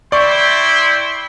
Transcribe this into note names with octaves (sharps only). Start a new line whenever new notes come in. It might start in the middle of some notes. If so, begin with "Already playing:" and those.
E4 D5 G5 C6 C#6